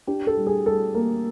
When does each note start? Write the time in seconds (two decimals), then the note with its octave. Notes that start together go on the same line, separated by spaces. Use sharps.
0.07 D4 G4
0.27 A4
0.37 G3
0.47 G#4
0.66 G3 A4
0.95 A#3